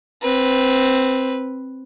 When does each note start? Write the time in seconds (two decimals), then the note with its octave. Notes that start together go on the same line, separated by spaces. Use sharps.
0.22 C4 B4